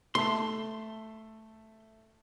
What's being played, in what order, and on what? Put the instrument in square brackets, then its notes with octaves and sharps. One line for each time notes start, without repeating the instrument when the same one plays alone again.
[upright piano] A3 E5 A5 [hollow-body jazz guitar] C6